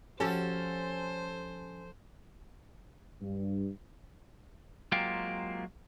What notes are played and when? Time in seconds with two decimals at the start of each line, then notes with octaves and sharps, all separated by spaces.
0.20 F3 C#4 F#4 G4 A4 C5
3.20 G2
4.92 F#3 G#3 A#3 C4 F4 G4